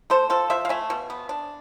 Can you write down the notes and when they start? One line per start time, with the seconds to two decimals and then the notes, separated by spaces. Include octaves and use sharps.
0.10 A3 A4 C5
0.30 F3 F4 A4
0.50 F3 C5 E5
0.65 F5
0.69 A3 E5 G#5
0.90 B2
1.10 B3
1.29 D4